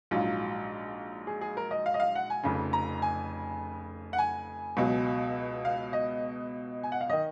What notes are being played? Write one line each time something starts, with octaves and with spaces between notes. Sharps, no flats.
A#1 G#2 F#3 F4
G#4
G#4
A#4
D#5
F5
D#5
F5
F#5
G#5
F1 F2 C#3
A#5
G#5
F#5
G#5
C#2 B2 F#3
F5
D#5
G#5
F#5
F5
D#3 D#5